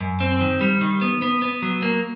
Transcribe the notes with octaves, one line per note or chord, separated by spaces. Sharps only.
F#2
C4
D#3
G3
D#3
B3
B3
B3
F#3
A#3